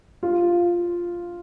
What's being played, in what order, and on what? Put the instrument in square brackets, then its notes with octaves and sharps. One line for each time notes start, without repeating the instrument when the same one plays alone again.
[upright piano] F4